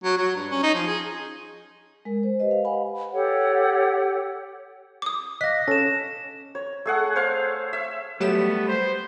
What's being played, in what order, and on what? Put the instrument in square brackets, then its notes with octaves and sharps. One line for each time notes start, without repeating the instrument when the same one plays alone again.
[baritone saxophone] F#3
F#3
G2
C#4
D#4
F3
G#4
[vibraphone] G#3 A#4
C5
G4 B4 C5 D#5
F5
B4 D#5 F5 F#5 G#5 B5
[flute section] G4 A4 C#5 F#5
[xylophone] D6 D#6
[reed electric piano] D#5 F5 [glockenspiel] F#6 A#6 [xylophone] B6
[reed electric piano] C#4 A4 [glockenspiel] A#6 E7
[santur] C#5
A3 G#4 F#5
C5 C#5 F5
E5
[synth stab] F#3 G4 E7 [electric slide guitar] G3 A3 [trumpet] B3
[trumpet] C5